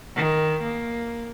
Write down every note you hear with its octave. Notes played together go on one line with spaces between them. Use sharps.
D#3
A#3